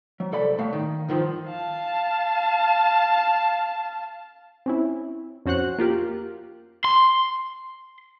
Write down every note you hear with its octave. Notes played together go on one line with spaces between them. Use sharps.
F#3
C2 A4 D5 B5
A2 A3 F5
D#3
G2 D#3 F3 F4
F5 A5
C4 C#4 E4
F2 C#4 F#4 C5 F#5 F#6
A#3 F4 G4 A#4
C6